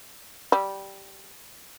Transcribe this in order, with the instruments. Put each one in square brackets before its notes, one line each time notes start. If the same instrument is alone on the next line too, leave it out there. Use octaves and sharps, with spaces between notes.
[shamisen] G3